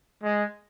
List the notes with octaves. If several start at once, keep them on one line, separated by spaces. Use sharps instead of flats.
G#3